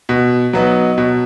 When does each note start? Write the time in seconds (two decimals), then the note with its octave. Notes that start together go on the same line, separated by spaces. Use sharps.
0.09 B2
0.53 F#3 B3 D#4
0.98 B2